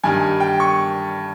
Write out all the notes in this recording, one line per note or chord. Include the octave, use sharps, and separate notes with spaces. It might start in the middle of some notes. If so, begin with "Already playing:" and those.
G2 D#3 G3 G#5
G5
C#6